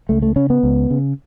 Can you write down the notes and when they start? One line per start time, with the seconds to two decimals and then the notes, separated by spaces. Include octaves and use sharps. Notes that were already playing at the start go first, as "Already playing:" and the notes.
0.09 C#2 A3
0.22 A3
0.36 C#3 C#4
0.50 B3
0.63 C#2
0.91 C#3